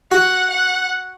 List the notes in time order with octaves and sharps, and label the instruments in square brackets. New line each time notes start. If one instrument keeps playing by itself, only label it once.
[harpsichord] F#4 [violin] F#5
[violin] F#5